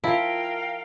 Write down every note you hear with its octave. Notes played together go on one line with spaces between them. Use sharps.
F3 E4 A#4 F5 G5